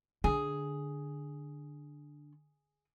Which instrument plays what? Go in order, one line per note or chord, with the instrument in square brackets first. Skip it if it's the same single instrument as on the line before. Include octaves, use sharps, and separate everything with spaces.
[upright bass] D3 [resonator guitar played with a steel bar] G#4